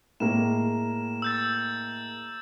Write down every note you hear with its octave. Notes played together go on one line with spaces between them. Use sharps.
A2 G#3 A#3 E7
E6 G6 A6